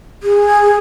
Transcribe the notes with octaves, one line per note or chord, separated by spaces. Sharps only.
G#4